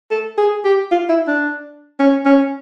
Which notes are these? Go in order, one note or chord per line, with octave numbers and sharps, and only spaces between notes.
A4
G#4
G4
F4
E4
D4
C#4
C#4